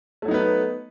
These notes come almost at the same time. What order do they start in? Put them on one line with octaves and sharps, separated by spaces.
A3 F#3 D#4 B3 B4